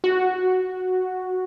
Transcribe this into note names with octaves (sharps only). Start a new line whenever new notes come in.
F#4